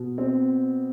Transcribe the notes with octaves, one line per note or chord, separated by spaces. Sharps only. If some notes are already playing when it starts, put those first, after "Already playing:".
Already playing: B2
C4